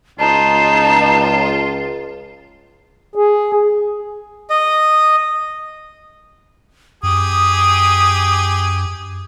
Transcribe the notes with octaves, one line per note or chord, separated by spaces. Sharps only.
C#2 D#4 F4 A5
G#4
D#5
F#2 G4 G#4 D#6